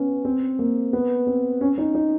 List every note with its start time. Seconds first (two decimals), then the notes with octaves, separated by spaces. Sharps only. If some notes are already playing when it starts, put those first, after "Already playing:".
Already playing: B3 C#4
0.25 C4
0.59 A#3
0.93 B3
1.27 C4
1.61 C#4
1.78 D#4
1.95 D#4